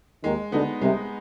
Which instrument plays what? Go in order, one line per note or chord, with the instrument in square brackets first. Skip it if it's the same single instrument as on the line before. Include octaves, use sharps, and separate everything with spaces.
[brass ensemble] D#2 D#3 [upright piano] G#3
[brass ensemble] D2 D3 [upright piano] B3 D#4
[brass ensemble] C2 C3 [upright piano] G#3